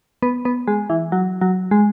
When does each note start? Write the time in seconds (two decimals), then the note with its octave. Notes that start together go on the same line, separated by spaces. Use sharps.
0.22 B3
0.45 B3
0.68 G#3
0.90 E3
1.12 F#3
1.41 F#3
1.71 G#3